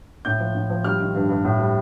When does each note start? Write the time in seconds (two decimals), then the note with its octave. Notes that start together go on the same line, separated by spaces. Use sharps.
0.25 A2 G6
0.39 F3
0.55 A2
0.70 F3
0.84 G3 F6
1.00 D#3
1.15 G2
1.29 G2
1.45 A2
1.59 G3